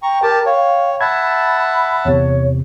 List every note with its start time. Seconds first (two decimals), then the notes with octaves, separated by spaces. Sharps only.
0.03 G5 A#5 C#6
0.23 G4 A#4 G5 A5
0.46 C#5 F5
1.01 E5 F#5 A5 B5 G#6
2.05 E2 C3 C#5